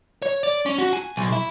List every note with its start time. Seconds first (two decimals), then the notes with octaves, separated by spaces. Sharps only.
0.22 C#5
0.43 D5
0.66 C#4
0.78 F#4
0.93 G#5
1.16 B1
1.32 E4